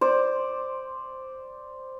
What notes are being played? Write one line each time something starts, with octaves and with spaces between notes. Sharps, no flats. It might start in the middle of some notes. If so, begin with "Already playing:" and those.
C5 D5